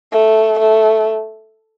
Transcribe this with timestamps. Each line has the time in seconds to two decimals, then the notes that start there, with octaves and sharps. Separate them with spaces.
0.12 A3
0.59 A3